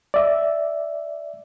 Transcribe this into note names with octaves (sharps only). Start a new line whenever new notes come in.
D5 E5